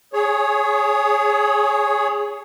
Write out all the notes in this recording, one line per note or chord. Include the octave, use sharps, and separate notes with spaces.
G#4 C#5